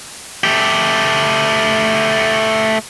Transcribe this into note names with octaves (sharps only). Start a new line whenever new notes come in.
A3 G4